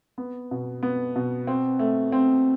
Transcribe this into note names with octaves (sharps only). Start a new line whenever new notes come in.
B3
B2
B3
B2
C4
A3
C4